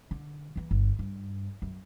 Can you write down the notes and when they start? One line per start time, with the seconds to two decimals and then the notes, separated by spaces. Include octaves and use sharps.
0.11 D3
0.56 E3 A#3
0.71 G1
0.99 G2
1.62 F#2